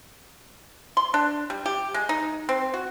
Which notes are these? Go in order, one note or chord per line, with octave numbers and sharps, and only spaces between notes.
C6
D4
G3
G4
G#3
D#4
C4
F#4